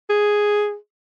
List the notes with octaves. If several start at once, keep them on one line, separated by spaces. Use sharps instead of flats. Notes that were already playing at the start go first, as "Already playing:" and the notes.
G#4